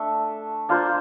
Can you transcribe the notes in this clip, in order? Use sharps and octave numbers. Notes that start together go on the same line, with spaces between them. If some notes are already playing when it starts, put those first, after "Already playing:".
Already playing: A3 D4 A4 E5
A#3 D4 F4 C5